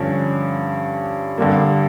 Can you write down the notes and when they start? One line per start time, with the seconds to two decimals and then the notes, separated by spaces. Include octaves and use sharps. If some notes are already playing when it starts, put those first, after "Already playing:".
Already playing: G2 D3 F3 C#4
1.38 G2 D3 G3 A#3